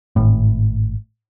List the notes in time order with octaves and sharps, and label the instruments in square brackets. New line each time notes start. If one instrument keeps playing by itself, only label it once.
[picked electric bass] G#1 A2